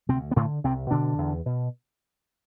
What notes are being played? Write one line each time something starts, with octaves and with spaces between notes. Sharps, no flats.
D2 C3 C4
B3
A2 D3 A3
C2 C3 C4
B2 D3 D4
E2
B2